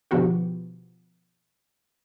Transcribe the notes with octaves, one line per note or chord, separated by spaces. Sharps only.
B2 D3 F3 B3 F#4 G4